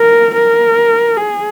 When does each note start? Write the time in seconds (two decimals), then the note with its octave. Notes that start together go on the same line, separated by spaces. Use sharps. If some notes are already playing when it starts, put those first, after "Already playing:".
Already playing: A#4
0.34 A#4
1.17 G#4